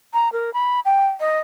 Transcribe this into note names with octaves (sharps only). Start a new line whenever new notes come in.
A#5
A#4
B5
G5
D#5